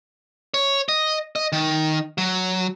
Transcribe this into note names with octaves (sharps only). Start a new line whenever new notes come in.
C#5
D#5
D#5
D#3
F#3